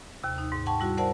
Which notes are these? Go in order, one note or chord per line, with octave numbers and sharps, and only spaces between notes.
D#2 C3
D#4
G#2
F#5 G5 A5 C#6
G3 E4 F#4
A#4 C5 D5 F#5 A5